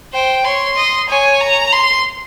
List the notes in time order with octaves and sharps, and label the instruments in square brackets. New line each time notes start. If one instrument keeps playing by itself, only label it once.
[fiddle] C5 [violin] G5
[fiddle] C#5 [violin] C6
[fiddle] D#5
[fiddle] C#5 [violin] G#5
[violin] A#5
C6